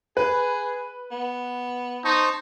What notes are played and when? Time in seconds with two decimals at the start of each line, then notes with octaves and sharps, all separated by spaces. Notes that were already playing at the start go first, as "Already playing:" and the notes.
0.17 G#4 B4
1.11 B3
2.05 D#4 C5 A5 C#6